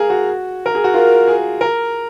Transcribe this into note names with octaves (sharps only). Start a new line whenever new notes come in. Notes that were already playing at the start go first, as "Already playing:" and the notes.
Already playing: G#4 A#4 F5
F#4
A#4
G#4
F#4
F4 A#4
G#4
A#4